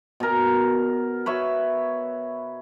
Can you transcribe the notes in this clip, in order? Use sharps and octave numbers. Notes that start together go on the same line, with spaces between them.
B2 A#4
B4 C#5 E5